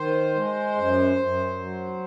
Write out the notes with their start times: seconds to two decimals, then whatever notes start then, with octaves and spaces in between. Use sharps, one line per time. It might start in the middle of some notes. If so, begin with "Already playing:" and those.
Already playing: D#3 C5
0.35 G#3
0.76 F#2
1.17 F#2
1.59 F#3